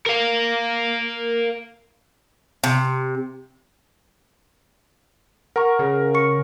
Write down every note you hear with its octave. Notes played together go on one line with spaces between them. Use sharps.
A#4 F5
C3
A#4 F#5 A#5 C#6
C#3
C#6 C#7